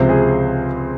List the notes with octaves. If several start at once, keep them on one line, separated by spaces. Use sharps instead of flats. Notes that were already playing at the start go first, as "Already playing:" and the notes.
Already playing: C#2 C3 F3 C4 C5
G#4